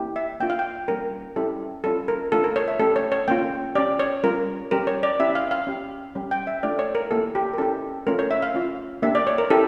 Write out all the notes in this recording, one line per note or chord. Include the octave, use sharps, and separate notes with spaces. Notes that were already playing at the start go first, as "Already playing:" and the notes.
Already playing: A#3 E4 G4
E5
A#3 D4 F4 G5
F5
G5
G3 A#3 C#4 A#4
G3 C#4 E4 G4 A4
G3 C#4 F4 A4
A#4
A3 D4 F4 A4
A#4
C#5
E5
A3 C#4 G4 A4
C#5
C#5
A#3 C#4 F4 G5
C#4 G4 D5
C#5
G3 C#4 F4 A#4
G3 C#4 G4 A#4
C#5
D5
C#4 E4 G4 E5
F5
F5
C#4 G4
G3 C#4 G4
G5
E5
A3 D4 F4 D5
C#5
A#4
A#3 E4 G4 A4
G4
A#4
C#4 E4 G4 A4
A3 C#4 F4 A#4
C#5
E5
F5
C#4 F4
A#3 D4 G4 E5
D5
C#5
A#4
C#4 E4 G4 A4